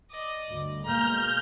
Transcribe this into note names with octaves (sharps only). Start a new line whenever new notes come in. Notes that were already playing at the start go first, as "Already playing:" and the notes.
D5 D#5
D2 G2
B2 G#3 A#3 A#5 F6 G6